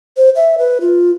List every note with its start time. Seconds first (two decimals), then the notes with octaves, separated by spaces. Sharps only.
0.17 C5
0.35 E5
0.58 B4
0.80 F4